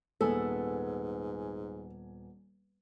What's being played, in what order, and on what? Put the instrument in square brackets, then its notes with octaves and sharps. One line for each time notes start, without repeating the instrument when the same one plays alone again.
[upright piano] D#1 G#5 [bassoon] G#2 [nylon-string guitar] B3 [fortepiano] A4